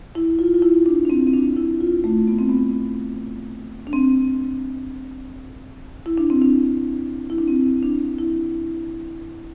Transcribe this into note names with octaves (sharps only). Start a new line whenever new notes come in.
E4
F4
F4
E4
D4
D4
C4
C4
D4
E4
F4
A3
B3
C4
B3
D4
C4
E4
D4
C4
D4
E4
D4
C4
D4
E4